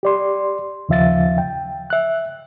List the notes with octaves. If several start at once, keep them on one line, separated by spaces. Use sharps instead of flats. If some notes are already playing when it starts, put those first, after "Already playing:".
G4 D5 C6
D#2 C#3 F3 E5 F5 A6
G5
E5 F#6